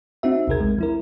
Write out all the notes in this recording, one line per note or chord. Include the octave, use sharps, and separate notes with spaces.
C4 D#4 F#4 E5
A#1 D#2 C3 G#4 A#4 G#6
G#3
F3 E4 A#4